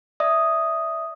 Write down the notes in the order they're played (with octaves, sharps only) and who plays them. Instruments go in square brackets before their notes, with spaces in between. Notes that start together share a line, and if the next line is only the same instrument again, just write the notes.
[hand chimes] D5 E5 D#6